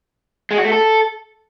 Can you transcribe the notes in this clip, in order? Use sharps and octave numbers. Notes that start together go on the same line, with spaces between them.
G#3
F#4
A3
A4